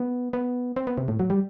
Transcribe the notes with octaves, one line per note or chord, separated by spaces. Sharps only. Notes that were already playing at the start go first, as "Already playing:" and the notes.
Already playing: B3
B3
C4
B3
C3
A2
F#3
G3